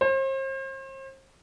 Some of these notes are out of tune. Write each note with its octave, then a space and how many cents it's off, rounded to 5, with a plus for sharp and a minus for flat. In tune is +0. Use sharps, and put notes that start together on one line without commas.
C5 +40